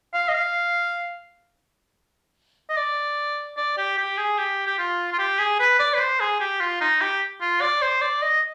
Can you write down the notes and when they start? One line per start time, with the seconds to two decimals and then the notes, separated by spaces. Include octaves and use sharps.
0.14 F5
0.28 D#5
0.34 F5
2.69 D#5
2.76 D5
3.57 D5
3.77 G4
3.98 G4
4.18 G#4
4.38 G4
4.67 G4
4.79 F4
5.13 F4
5.19 G4
5.39 G#4
5.59 B4
5.79 D5
5.94 B4
6.00 C5
6.20 G#4
6.40 G4
6.60 F4
6.81 D#4
7.01 G4
7.41 F4
7.61 D5
7.82 C5
8.01 D5
8.22 D#5